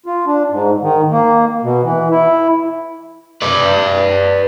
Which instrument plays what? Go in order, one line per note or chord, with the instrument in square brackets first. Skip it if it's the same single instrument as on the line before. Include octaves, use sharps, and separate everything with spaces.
[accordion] F4
D4
G#2
D#3
A#3
B2
E3
E4
[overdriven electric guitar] B4 D5